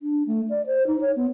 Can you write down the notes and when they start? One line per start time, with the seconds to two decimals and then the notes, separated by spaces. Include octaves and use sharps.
0.02 D4
0.27 A3
0.50 D5
0.66 C5
0.87 D#4
1.01 C#5
1.16 B3